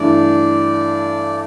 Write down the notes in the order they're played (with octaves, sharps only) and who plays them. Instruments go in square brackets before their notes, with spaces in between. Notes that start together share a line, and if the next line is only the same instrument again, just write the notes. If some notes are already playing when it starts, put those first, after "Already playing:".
Already playing: [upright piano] G2 E3 A3 D4 [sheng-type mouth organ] D5